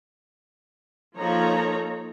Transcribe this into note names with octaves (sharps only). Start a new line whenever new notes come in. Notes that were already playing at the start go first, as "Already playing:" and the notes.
F3 A#3 D#4 A4 C#5 A#5